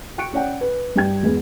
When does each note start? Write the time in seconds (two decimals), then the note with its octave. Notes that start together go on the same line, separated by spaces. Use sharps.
0.18 G5 C#6 F#6 C#7 D7
0.33 C#4 C#5 D5 F#5 G5
0.61 B4
0.96 G2 G4 G5 G#6
1.23 E2 G#3 B3